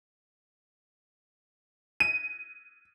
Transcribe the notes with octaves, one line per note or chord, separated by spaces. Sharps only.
D#7